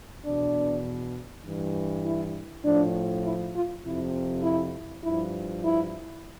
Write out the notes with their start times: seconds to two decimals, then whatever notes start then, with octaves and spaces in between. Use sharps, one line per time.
0.25 E2 B2 D4
1.44 G2 E3
2.05 E4
2.65 A2 F3 D4
3.24 E4
3.54 F4
3.83 F2 C3 F3 E4
4.43 E4
5.03 G2 F3 E4
5.63 E4